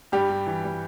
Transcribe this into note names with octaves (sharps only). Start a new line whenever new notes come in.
G2 G3 G4
G2
E3
G3